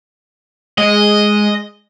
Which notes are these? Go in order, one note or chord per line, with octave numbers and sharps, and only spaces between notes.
G#3 D#5